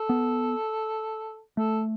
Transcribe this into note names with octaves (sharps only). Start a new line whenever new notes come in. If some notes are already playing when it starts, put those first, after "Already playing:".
Already playing: A4
B3
A3 A4